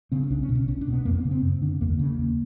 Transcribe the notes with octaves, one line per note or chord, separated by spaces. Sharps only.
C#3 C4
C#4
C2 D4
C#4
B2
C#4
C2 C#4
D4
B2
B3
F2 A#3
C4
B3
C#3
C4
F#2
D3 D4
E2 A#3
A3
A#3
C#3
A#3
D#2